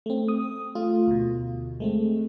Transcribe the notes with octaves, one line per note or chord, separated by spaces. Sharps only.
A3 C4
D#6
A3 F4
D2 B2
G#3 A3 C4